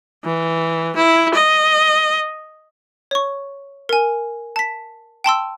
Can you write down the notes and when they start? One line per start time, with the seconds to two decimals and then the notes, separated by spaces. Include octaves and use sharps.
0.25 E3
0.96 E4
1.34 D#5
3.11 C#5 C#6
3.89 A#4 G#5
4.56 A5 B6
5.24 G5 A5 C6 E6